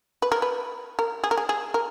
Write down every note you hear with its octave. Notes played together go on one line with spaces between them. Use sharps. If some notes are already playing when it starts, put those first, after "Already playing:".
B4
A#4
B4
A#4
G#4
A#4
G#4
G#4
A#4